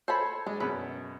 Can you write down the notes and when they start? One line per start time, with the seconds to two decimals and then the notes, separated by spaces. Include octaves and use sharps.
0.08 A4 C5 C#5 A5 B5
0.46 G#3 D4 D#5
0.60 F#2 B2 C#4 B4